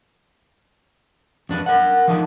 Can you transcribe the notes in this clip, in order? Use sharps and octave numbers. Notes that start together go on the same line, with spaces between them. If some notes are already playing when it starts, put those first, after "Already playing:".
F2 D4 B4
A#4 F#5
F3 D4 D#4